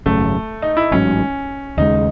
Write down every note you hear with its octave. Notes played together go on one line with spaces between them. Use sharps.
G#1 F#2 C#3 A3
D#4
E4
A1 G#2 F#3 C#4
D#2 C#3 G#3 D#4